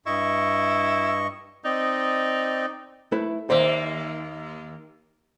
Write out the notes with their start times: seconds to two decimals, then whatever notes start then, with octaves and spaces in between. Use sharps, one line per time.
0.06 G2 E4 D#5 C#6
1.65 C4 D#4 D5 D#5
3.12 A3 E4 B4
3.50 D#2 A#3 C5 D5 E5